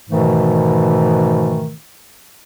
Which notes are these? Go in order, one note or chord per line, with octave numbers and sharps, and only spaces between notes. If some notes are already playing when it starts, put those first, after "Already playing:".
G#2 B2 D#3 E3 A3